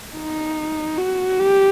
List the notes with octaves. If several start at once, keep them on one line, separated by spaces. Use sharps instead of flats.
D#4
F#4
G4